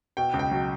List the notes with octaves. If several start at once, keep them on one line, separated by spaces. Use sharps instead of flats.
B2 G5
C#2
G5
F#3